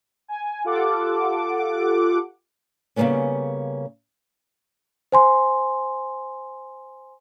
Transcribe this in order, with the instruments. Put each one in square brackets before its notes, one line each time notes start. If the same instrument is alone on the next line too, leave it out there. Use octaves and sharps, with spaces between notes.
[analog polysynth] G#5
F4 G4 A4 F#5 D6
[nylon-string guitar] C#3 G3 G#3 A#3 B3 C#4
[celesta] C5 G#5 C6